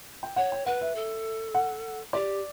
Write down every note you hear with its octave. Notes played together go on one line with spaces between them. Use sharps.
G5
C#5 F#5
G5
B4 F#5
E5
A4
F#5
G4 D5